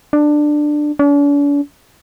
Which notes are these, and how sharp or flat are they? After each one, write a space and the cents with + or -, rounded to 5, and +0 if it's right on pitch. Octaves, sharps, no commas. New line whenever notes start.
D4 +15
D4 -45